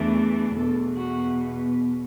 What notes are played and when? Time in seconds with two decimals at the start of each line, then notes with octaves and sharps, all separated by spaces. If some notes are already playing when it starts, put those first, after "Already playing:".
Already playing: E2 E3 A3 D4
0.56 E2 B2 B3 A4
0.96 F#4